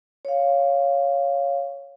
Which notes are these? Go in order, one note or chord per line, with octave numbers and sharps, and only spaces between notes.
C#5 F5